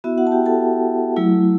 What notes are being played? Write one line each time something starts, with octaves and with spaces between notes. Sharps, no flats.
B3 E4 F#4 E5
F#4 F#5
A5
G4 G5
A4 A5
F#3 A3 E4